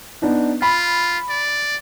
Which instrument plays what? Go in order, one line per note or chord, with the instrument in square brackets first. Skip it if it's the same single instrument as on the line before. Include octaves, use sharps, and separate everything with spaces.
[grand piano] B3 D4 D#4
[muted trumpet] F4 [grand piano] B5
[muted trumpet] D5